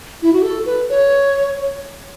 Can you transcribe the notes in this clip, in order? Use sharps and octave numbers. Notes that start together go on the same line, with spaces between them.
E4
F#4
A4
B4
C#5